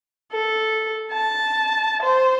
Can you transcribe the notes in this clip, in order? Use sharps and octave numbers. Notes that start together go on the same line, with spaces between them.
A4
A5
C5